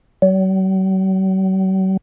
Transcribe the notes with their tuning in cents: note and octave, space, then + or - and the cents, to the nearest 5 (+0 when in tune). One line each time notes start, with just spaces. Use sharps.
F#3 +45